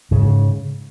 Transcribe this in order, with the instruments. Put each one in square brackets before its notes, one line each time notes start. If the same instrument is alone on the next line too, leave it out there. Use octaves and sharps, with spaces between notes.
[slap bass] G#2 C#3